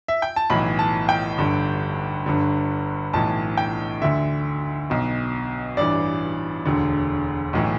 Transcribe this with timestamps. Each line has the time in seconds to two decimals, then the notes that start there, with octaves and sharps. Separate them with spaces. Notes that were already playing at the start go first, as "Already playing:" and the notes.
0.08 E5
0.22 G5
0.36 A5
0.50 B1 A2 E3 B5
0.79 A5
1.09 G5
1.38 G1 G2 D3
2.26 G1 G2 D3
3.13 B1 A2 E3 A5
3.57 G5
4.02 D2 D3 E5
4.90 B1 B2
5.77 A1 G2 E3 D5
6.66 E1 D2 D3
7.53 B1 A2 E3